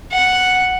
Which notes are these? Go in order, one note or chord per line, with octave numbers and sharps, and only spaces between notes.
F#5